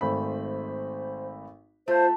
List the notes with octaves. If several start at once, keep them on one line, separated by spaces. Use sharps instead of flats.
G#1 A3 C5 B5
A3 F4 C5